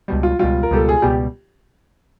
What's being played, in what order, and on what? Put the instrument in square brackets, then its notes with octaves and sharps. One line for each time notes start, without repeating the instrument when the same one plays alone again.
[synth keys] C#2 B2 G3
[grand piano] F4
[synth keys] C#2 B2 G3 [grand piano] F4
[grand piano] A#4
[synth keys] C#2 B2 G3 [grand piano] A4
[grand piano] G#4
[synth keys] C#2 B2 G3 [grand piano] G4